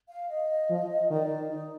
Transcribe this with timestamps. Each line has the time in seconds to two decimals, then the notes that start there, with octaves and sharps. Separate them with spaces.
0.09 F5
0.30 D#5
0.70 F3
1.10 D#3 D5
1.51 D#4